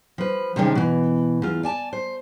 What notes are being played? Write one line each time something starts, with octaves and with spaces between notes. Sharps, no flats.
F3 B4
C3 D#3 F3 G#3 C#4 D4
B2 E3
E2 F4
D5 G#5 A5
C5